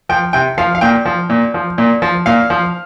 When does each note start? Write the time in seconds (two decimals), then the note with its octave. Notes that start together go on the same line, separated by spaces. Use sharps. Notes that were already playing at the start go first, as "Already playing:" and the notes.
0.09 F3 G5
0.33 C3 G5
0.58 F3 F5
0.75 F5
0.81 A#2 G5
1.05 F3
1.30 A#2
1.54 F3
1.78 A#2
2.02 F3
2.26 A#2 F5
2.50 F3